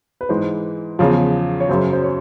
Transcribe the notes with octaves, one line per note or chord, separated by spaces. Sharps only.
B4
G#2 E3 G#3 C5
E2 C#3 F3
C#5
F#2 C#3 F#3 C5
C5
C#5